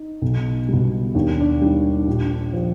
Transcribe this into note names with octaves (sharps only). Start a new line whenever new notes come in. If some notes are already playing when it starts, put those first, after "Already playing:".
Already playing: D#4
B1
B2 G3
D#2 D4
D4
D#3 G3
A#1
F3